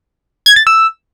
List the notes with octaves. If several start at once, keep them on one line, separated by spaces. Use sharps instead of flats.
G#6
A6
E6